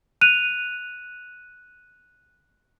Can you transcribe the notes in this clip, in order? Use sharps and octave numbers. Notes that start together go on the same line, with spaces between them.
F#6 D#7 F7